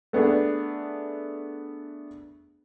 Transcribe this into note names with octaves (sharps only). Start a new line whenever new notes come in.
A3 B3 D4 G#4